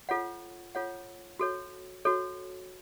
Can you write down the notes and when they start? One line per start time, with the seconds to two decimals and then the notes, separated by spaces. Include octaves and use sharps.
0.09 F4 A4 C#5 F#5
0.75 F4 A4 C#5 F#5
1.39 F#4 A4 C#5
2.05 F#4 A4 C#5